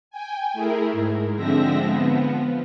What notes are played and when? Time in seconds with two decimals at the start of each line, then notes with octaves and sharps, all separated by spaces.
0.11 G5 G#5
0.53 A3 E4 G#4 A#4
0.92 G#2
1.36 D3 F3 G#3 C4 E5 A#6
1.76 F3 B3